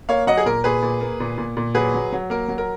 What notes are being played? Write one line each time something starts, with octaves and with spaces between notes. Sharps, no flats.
A#3 C#5 F5
F#3 D#5 F#5
G#4
A#2 A#4
A#2 G#4 B4
A#2
A#3
A#2
A#2
A#2
F#3 G#4 B4
F#3
F#3
A#3 A#4
F#3
A#4